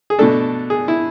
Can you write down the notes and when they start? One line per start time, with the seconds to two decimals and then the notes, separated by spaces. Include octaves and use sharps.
0.10 G#4
0.19 B2 A3 D4 A4
0.70 G#4
0.88 E4